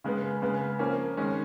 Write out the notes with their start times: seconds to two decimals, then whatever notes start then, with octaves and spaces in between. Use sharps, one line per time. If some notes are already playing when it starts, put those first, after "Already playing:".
0.04 C#3 G#3 B3
0.42 C#3 G#3 B3
0.79 F3 A#3 C#4
1.17 D#3 G#3 C#4